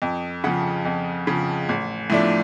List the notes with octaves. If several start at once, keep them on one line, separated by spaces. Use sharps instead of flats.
F2
C#3 F3 F#5
F2
C#3 F3
A1
A2 F3 A3 D4